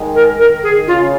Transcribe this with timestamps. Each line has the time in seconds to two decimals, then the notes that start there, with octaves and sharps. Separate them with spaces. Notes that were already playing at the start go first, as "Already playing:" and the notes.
Already playing: D#3 G#3
0.14 A#4
0.38 D#3 A#4
0.63 G#4
0.87 C#3 F4